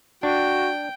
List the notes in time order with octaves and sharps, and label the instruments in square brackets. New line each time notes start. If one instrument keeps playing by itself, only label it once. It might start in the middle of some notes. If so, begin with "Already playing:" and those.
[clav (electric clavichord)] D4 [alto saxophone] F#4 [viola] G5